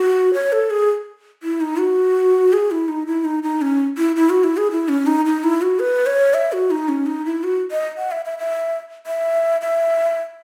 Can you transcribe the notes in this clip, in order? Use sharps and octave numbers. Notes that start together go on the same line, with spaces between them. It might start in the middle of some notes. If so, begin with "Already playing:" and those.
Already playing: F#4
C#5
A4
G#4
E4
D#4
F#4
G#4
E4
D#4
E4
D#4
D#4
C#4
E4
E4
F#4
E4
G#4
E4
C#4
D#4
D#4
E4
F#4
B4
C#5
E5
F#4
D#4
C#4
D#4
E4
F#4
D#5
F#5
E5
E5
E5
E5
E5